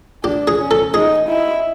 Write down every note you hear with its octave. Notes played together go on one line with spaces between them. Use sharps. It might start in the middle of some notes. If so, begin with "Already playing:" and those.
D4 G4
G#4
C#4
A4
D#4 G#4
E4